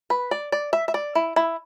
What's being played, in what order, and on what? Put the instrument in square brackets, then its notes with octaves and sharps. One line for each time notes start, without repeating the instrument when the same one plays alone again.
[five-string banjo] B4
D5
D5
E5
E5
D5
E4
E4